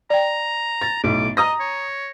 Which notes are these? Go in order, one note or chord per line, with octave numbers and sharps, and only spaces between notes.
D5 G5 A#5
A6
B1 A2 D6
D#5 A#5 D#6 A#6
C#5